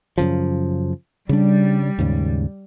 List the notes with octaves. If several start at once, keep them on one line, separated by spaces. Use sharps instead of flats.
F#2 C#3 F3
C#3 G3 D4
D#2 G#2 C#3